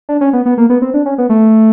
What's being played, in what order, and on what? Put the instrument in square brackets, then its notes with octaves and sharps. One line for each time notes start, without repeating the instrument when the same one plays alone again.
[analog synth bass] D4
C#4
B3
B3
A#3
B3
C4
D4
C#4
B3
A3